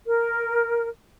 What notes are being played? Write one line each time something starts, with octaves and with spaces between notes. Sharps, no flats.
A#4